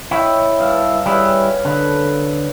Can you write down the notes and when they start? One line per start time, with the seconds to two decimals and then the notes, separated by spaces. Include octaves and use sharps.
0.11 E4 C#5 D#5 G5
0.59 G2 F5 A5
1.06 G3 C#4 E4 G#4 B4
1.65 D3 A4 B4